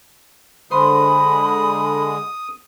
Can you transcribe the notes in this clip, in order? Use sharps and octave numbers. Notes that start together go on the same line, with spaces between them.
D3 G#3 C5 B5 C6 D#6